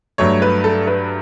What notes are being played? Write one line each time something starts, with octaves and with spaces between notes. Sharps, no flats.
G2 F#3 A3 C#5
B4
A4
B4